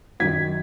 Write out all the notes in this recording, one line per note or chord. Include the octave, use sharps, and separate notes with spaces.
F#2 D#3 F#3 G#6 B6